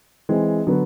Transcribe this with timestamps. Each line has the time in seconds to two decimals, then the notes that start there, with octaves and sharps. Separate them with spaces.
0.29 E3 G#3 C4
0.67 D3 F#3 B3